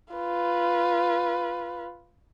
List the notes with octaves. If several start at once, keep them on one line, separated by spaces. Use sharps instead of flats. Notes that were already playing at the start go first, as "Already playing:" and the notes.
F4 B4